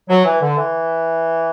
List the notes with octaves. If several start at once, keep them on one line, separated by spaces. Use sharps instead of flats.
F#3
E3
D3
E3